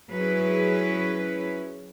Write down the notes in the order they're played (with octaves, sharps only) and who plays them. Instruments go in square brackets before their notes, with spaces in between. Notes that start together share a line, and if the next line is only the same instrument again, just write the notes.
[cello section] F#3 C#4 E4 G#4 B4